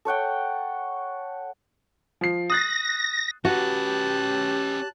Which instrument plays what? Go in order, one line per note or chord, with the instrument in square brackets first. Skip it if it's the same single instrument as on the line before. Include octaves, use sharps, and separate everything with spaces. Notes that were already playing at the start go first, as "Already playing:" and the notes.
[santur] A4 C#5 F#5 G5
[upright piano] F3 C7
[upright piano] D#6 F#6 A6 [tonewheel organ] A#6
[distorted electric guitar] C#4 B4 [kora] F#4 [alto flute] G4 [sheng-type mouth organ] A5 F#6